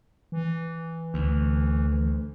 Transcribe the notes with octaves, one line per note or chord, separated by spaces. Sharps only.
E3
D2